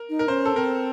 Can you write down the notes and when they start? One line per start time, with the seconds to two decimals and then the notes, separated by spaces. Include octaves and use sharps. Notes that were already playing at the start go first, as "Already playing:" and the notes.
Already playing: A#4
0.09 D#4
0.19 A#4
0.28 C#4 C5
0.45 A4
0.56 C4 A#4